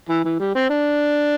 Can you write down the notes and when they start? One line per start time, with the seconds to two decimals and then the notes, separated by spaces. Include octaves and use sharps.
0.09 E3
0.25 E3
0.39 G3
0.55 C4
0.70 D4